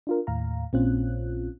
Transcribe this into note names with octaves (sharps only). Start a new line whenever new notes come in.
D4 F4 A#4
D#2 A2 F5 A#5
A#1 A#2 C4 C#4 F4 F#6